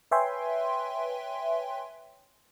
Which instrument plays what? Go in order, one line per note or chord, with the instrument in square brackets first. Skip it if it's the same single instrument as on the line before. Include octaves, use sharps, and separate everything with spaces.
[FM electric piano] B4 C#5 E5 G5 G#5 C6